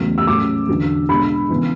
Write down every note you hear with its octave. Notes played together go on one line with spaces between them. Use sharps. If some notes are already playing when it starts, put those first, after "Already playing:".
Already playing: E2 C#3 F#3 A3
E6
A2 F#3 C#4 D6
E2 D3 F#3 B3 D4
B2 G#3 D4 B5
C#3 E3 B3